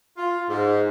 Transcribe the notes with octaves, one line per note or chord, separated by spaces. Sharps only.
F4
G#2